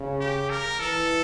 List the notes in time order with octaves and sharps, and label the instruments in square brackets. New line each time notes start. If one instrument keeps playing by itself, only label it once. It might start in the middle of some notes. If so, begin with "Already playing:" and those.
Already playing: [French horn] C#3
[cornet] G4
A#4
[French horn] E3 [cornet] A4